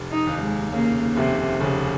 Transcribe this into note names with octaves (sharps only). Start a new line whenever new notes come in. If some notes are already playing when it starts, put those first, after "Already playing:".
Already playing: F1
D#4
D#2
G#3
C#3 A#3
F1 C3
F1 C#3